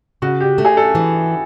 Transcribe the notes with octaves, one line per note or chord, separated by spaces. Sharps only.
C#3 F#4
G4
A3
G#4
A4
E3